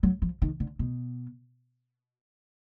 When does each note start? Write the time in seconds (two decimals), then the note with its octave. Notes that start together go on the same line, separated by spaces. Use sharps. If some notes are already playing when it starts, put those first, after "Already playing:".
0.03 F#3
0.22 F3
0.42 D#3
0.60 D3
0.79 B2